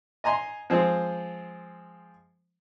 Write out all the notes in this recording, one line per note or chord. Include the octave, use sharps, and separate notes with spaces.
D#5 G#5 A#5 C6
F3 G#3 C4